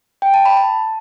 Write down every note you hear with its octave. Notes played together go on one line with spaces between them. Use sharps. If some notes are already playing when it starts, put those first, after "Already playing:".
G5
A5
B5
A5